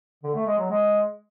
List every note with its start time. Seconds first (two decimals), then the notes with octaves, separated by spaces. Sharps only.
0.23 D3
0.35 A3
0.47 G#3
0.58 F#3
0.70 G#3